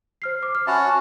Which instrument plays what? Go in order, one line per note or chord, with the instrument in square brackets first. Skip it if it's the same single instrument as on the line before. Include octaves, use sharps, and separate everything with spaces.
[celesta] C5 F6 C7
D6
F6
[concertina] C#4 F#4 A5 [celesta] E5 B5 F#6